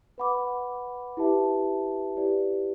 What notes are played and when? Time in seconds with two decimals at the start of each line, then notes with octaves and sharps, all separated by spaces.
0.18 B4 F#5 B5 D6
1.17 E4 G4 B4 E5 A5
2.17 E4 G4 B4 D5